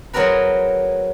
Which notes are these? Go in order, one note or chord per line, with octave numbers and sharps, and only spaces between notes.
F#3 C4 G#4 A#4 B4